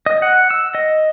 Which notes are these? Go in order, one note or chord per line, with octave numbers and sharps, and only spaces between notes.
D#5
F#5
E6
D#5